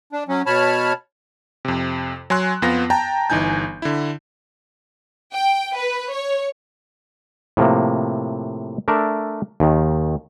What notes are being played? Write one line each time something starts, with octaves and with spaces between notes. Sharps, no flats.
D4
F#3 C#4
B2 C#5 A5 B5 F6
F2 C3
F#3 G#5 C6 F#6
F2 B3 F4 A#6
G5 A5 A#5
G1 E3 D#4 G#5 G6
D3 E4
G5
B4
C#5
A2 C3 F3 A#3
A3 D4 A#4 D5 E5
D#2 D#3